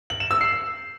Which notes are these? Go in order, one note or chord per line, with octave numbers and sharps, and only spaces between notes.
F#7
E7
E6
C7